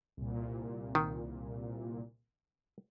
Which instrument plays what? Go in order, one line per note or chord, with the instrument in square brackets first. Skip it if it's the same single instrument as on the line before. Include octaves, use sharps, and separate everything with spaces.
[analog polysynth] C2 A#2
[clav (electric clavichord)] D#3